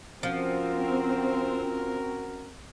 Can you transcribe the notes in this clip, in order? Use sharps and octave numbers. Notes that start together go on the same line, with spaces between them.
F3 C4 C#4 F#4 A#4